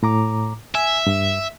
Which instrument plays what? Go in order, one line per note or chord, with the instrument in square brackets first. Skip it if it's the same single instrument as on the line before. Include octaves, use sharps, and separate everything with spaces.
[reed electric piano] A2 A#5 D6
[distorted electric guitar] E5 [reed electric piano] G#5
[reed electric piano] G2